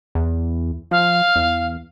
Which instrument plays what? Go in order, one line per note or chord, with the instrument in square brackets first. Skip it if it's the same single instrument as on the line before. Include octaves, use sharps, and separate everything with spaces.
[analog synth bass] E2
[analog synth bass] F3 [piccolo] F5
[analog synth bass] E2